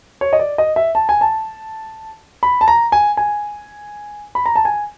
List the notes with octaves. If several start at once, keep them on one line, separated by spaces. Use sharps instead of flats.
C#5
D#5
D5
D#5
E5
A5
G#5
A5
B5
A5
A#5
G#5
G#5
B5
A#5
A5
G#5